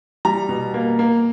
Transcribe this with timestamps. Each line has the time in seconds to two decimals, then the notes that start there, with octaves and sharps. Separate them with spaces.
0.25 G3 A#5
0.49 B2
0.74 A#3
0.99 A#3